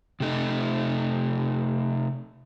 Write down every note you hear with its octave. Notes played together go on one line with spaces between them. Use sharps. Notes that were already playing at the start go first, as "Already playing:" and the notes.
C3 A3 D#4